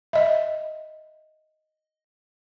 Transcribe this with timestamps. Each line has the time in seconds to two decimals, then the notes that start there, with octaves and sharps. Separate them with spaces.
0.13 D#5 E5